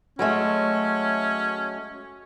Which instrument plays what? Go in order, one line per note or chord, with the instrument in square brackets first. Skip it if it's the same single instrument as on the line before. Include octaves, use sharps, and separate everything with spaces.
[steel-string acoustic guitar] F#3 G#3 A3 [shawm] C#4